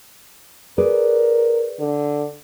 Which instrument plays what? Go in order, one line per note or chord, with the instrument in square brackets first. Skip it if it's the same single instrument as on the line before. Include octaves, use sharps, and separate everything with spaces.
[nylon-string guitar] G#4 B4 D5 [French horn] A#4
[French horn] D3